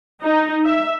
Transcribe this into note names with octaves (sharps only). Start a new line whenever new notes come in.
D#4
E5